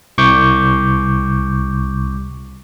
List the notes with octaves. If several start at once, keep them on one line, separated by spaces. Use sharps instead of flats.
C2 C#6 D6 G6